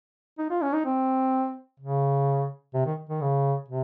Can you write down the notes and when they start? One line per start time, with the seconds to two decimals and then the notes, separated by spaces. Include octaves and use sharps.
0.38 D#4
0.50 F4
0.62 C#4
0.73 D#4
0.85 C4
1.80 C#3
2.74 C3
2.86 D#3
3.10 D#3
3.21 C#3
3.68 C3